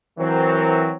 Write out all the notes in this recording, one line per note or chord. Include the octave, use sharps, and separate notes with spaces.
E3 F#3 C4 A#4 C5